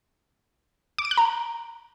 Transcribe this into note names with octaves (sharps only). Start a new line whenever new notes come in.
D6
D7
F#6
A#5